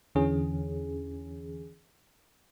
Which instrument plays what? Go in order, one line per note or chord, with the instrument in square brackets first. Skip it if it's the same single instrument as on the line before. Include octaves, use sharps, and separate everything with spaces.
[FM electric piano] E2 D3 E3 C#4 G#4